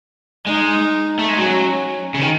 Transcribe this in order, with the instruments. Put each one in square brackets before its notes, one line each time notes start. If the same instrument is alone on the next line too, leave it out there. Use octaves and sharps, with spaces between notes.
[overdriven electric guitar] G#3 [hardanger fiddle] D#4
[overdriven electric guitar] A3
G#3
[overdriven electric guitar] F#3 [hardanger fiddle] C#4
[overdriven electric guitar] C#3
D#3